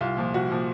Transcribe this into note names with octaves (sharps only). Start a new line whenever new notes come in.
C2 F4
A#2 F3
C2 F#4
A#2 F3